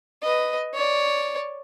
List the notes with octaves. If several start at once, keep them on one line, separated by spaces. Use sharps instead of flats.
B4 D#5
C#5 D5